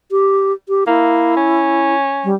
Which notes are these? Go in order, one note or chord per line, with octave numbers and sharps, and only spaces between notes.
G4
G4
A#3 E4
C#4
G3